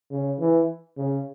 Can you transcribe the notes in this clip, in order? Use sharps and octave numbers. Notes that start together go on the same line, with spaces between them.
C#3
E3
C#3